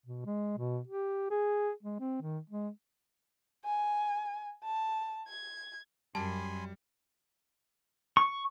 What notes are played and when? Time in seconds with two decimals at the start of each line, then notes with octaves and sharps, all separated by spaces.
0.06 B2
0.26 G#3
0.58 B2
0.88 G4
1.31 G#4
1.83 G#3
2.00 C4
2.22 D#3
2.50 G#3
3.65 G#5
4.64 A5
5.28 G#6
6.15 F#2 G3 G#5 A5 B5 C6
8.17 C#6